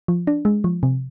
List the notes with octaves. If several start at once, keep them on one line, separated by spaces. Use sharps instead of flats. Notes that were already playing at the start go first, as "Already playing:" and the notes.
F3
D4
G#3
F3
C3